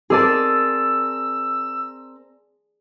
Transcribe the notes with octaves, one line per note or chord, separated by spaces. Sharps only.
C4 G#4 A#4 D5 A5 E6